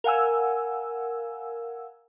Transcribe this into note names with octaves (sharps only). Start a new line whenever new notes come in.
A#4 F5 F#5 G#5 E6